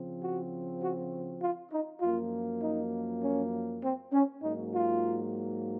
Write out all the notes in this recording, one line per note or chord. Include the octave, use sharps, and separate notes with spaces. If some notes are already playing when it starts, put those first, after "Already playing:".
Already playing: C#3 F3 C4
F#4
F#4
F4
D#4
F#2 F3 A#3 F4
D#4
C#4
C4
C#4
G#2 F#3 A#3 D#4
F4